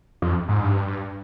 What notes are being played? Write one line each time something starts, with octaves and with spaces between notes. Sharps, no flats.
F2
G#2
G2